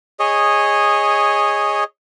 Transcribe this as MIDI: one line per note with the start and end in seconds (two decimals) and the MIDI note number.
0.19 1.84 68
0.19 1.84 73
0.19 1.84 75